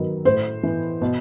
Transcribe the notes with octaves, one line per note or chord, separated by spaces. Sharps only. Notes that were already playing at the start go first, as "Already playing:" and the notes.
Already playing: D#3 F#3 B3
A2 C5
E3 B3
B2